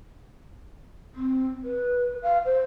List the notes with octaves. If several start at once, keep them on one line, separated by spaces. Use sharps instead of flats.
C4
B4
F5
C5